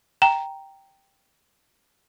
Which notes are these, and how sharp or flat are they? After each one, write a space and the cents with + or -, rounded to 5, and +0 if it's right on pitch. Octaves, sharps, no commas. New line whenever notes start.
G5 +0 A#5 +0